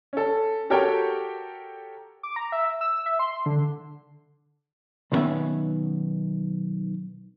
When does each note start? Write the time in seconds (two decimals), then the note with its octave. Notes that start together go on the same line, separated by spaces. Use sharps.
0.13 C#4 A4
0.70 F#4 G4 A4 A#4 C#5 G5
2.23 D6
2.36 A#5
2.52 E5
2.81 E6
3.06 E5
3.19 C6
3.46 D3
5.12 B1 D#3 F3 B3 C#4 E5